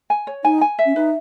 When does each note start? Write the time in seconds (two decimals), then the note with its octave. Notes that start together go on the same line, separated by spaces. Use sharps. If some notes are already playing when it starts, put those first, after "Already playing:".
0.10 G#5
0.27 C#5
0.44 D#4 G#5
0.61 G#5
0.79 E5
0.86 C#4
0.96 D#4 B4